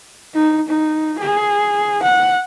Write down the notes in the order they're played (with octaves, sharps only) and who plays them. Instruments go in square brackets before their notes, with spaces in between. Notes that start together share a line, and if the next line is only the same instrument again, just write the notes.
[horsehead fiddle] D#4
D#4
G#4
F#5